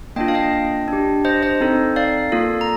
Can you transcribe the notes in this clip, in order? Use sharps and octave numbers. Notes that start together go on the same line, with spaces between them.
A#3 D4 F4 D#5 G5
F5
D#5 G5
D4 G4
C5 D#5
C5 D#5
C4 D#4 A4
D5 F5
A#3 F4 A4
A#5